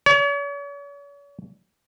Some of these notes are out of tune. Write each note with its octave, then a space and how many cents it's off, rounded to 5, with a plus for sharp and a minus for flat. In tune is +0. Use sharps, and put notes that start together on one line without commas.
C#5 +45